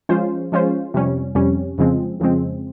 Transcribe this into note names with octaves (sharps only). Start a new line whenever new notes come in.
F3 G#3 C#4 F4 C5
F3 G#3 C#4 F4 C5
F2 C3 G3 C#4
F2 C3 G3 C#4
F2 C#3 F3 G#3 C4
F2 C#3 F3 G#3 C4